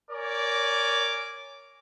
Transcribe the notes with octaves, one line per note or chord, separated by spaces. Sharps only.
A#4 C#5 D5 G#5 D6